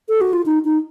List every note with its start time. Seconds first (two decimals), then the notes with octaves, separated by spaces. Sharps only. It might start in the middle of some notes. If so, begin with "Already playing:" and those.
0.09 A4
0.21 F#4
0.33 F4
0.46 D#4
0.65 D#4